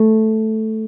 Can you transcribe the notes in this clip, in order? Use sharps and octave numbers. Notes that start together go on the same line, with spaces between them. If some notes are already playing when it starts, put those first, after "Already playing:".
Already playing: A3